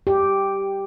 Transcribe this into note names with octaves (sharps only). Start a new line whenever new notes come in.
G4